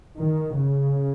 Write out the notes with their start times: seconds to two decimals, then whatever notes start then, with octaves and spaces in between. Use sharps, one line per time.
0.20 D#3
0.59 C#3